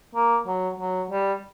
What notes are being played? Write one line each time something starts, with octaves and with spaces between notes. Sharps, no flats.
A#3
F#3
F#3
G3